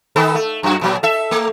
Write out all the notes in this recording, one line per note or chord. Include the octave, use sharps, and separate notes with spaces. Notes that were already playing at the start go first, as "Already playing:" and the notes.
D#3 B3 A4
A3
F#2 F#4
A#2 F#3
A4 E5
A3